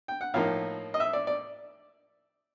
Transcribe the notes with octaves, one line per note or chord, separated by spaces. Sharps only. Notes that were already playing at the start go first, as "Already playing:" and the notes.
G5
F#5
A2 F3 A#3 D#4 F5
D#5
E5
D5
D5